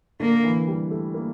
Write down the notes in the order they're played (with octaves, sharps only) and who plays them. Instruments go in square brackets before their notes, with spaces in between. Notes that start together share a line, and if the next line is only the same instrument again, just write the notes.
[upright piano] D3 [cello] A#3
[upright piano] E3
G3
A3
A#3